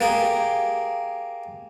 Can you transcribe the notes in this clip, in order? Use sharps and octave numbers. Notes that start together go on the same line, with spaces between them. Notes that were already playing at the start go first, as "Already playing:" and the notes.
A#3 G4 G#4